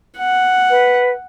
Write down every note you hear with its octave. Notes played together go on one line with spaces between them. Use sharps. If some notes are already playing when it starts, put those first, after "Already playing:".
F#5
B4